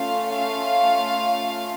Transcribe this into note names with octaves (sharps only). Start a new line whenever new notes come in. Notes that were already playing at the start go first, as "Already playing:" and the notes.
Already playing: A3 C#4 F4 F5
F5